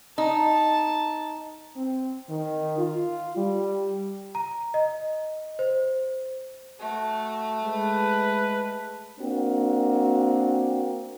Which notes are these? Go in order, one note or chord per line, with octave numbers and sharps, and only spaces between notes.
D#4 A5
C4
D#3
F4
G3
A#5
D#5
C5
A3 F#4
G#3 B4
A#3 C4 D4 F#4